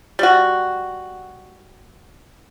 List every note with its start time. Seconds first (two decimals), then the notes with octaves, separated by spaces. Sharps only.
0.19 G3 F#4